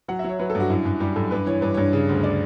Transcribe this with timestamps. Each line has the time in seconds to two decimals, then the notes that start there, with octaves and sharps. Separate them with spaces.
0.08 F#3 F#5
0.19 E5
0.24 F#3 C#5
0.39 F#3 B4
0.50 A4
0.55 G2
0.60 F#4
0.70 F#2 E4
0.85 F#2
1.00 G3 G4
1.16 F#2 A4
1.31 G2 B4
1.46 E3 C#5
1.61 G2 B4
1.74 G2 C#5
1.93 C#3
2.09 D2
2.24 D5